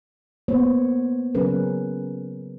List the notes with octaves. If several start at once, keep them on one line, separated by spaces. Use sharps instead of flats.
A#3 B3 C5 C#5
C#3 F#3 C#4 G#4 A#4 B4